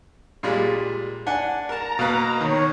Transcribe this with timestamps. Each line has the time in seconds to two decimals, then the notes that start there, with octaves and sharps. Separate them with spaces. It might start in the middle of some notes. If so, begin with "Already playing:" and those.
0.43 A#2 G3 G#3
1.26 D4 F#5 G#5
1.69 A#4 A5 A#5
1.99 B2 A#3 B4 F5 F#6
2.41 D#3 C#5